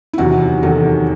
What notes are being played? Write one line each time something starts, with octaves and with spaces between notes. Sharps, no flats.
E4
E2 C3 D#3 F#3 F#4
E2 C3 D#3 F#3 A4